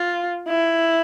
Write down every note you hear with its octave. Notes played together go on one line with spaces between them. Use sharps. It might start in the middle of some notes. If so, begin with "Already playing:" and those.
Already playing: F4
E4